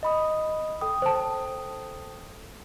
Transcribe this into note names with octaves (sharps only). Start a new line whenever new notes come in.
D#5 B5 D#6
A4 G5 D#6
C5 A5